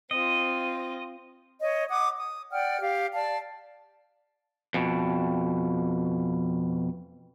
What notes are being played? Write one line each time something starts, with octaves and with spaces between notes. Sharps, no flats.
C4 F4 D#5
C#5 D#5
F#5 D6 D#6
D#6
D5 F#5 G5 F6
G4 F5
D5 F5 A5
F2 B2